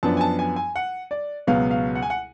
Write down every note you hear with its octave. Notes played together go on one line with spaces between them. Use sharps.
F#2 F3 B3 D4 A5
G#5
A5
G#5
G#5
F#5
D5
C#2 B2 F#3 B3 F5
F5
F#5
G#5
F#5